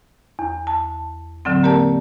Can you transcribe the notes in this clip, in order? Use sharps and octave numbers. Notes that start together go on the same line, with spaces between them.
E2
A5
A2 D3 F#3 C4
A#3 G4 A#4 D5 A5